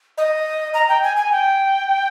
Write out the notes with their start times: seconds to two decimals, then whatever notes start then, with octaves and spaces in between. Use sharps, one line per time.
0.18 D#5
0.74 A#5
0.89 G5
1.03 G#5
1.17 G#5
1.32 G5